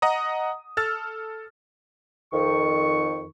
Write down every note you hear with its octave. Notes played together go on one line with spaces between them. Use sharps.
D#5 F#5 A#5 D#6
A4 E6 F6 A6
F2 D#3 C#6